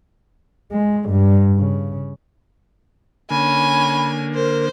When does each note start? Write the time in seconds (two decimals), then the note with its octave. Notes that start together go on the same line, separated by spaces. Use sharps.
0.72 G#3
1.09 G2
1.57 C#3
3.30 D3 A#3 C#4 G#5 B5
4.35 A#4 C5